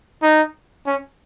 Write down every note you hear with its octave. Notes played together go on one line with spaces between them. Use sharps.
D#4
C#4